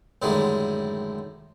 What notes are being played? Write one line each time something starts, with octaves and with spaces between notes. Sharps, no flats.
F#2 A2 D3 D#3 G3 G#3